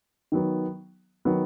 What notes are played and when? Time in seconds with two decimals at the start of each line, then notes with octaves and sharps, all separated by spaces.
0.32 D#3 F#3 B3
1.25 D#3 F#3 B3